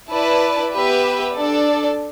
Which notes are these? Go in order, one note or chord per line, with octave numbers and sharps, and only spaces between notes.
E4 B4 D5 A5
B3 G4 B4 E5
D4 A4 D5